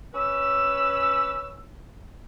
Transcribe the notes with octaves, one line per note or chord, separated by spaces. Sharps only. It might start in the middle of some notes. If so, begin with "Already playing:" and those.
C#4 B4 E6